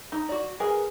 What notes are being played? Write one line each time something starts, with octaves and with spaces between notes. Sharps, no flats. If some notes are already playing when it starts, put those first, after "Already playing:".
D#4
F#4 D5
G#4 A#4 B4 G#5